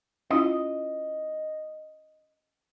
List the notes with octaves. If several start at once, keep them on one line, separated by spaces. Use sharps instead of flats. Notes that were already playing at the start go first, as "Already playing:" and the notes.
C#4 E4 F4 D#5